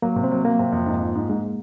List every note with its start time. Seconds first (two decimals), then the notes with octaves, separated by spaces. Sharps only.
0.02 F#3 A#3
0.16 C3
0.24 C4
0.31 F#3
0.44 F#3 A#3
0.59 C3
0.72 F2
0.86 G#2
1.01 F3
1.15 G#2
1.29 G#2 G#3